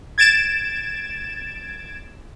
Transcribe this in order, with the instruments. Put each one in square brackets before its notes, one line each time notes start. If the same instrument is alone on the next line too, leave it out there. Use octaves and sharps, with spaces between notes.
[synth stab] G#6 A6 D7 E7